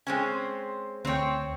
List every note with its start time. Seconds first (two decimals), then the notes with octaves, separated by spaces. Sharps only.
0.07 G#3 C4 C#4 G#5
0.32 C6
1.05 D2 C4 C#5 G5